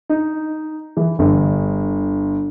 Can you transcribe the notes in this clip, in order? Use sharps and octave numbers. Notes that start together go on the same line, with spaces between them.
D#4
E3
G1